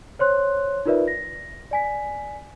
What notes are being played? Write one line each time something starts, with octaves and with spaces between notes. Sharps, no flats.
C5 C#5 C6 F#6
D#4 F4 A#4 B4 D5 E5
A#6
D5 G#5 B6